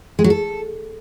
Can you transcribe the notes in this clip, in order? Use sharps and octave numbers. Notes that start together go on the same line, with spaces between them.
G#3
F#3
A4